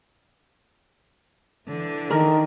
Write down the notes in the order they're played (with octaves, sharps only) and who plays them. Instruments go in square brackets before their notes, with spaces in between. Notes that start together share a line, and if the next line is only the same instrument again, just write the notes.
[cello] D3 E3
[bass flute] D#3 [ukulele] A#4